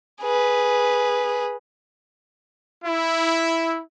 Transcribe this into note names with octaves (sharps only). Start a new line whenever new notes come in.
G#4 B4
E4